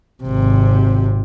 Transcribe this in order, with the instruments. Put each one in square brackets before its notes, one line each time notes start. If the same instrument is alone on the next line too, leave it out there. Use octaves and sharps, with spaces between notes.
[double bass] G#1 C3